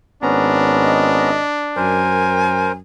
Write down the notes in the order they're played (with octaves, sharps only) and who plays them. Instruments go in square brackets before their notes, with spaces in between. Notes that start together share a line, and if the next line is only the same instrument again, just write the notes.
[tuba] G#1 [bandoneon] B3 C#4 A#5 [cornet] D4
[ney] D#5
[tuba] F#2 [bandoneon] A#4 C5 [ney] G#5